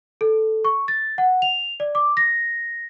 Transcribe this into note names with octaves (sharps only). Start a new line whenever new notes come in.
A4
C#6
A6
F#5
F7
D5
D6
A#6